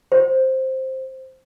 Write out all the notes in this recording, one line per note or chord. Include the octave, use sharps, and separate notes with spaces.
C5